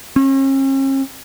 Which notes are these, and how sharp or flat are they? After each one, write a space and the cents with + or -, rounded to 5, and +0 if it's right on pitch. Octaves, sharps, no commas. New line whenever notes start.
C#4 -45